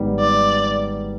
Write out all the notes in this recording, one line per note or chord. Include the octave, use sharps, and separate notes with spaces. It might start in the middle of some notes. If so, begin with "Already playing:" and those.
Already playing: G#1 G#2 G3 B3
D5